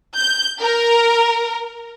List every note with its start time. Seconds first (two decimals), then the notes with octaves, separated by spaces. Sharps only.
0.15 G6
0.62 A#4